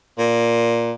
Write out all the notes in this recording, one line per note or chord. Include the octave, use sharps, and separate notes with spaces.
A#2